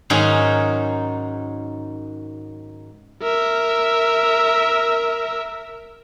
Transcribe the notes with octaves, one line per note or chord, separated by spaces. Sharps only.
G#2 D#3 F#3 C#4 D#4 G#4
A#4 E5